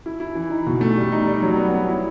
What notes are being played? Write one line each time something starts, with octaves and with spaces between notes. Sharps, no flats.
E4
E4
E3
D#4
B2
A3
G3
D#4
G3
F#3
B3
B3
E4